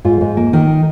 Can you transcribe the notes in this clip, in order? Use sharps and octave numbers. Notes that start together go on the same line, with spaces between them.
G#2 F4
G#2
A#3
D#3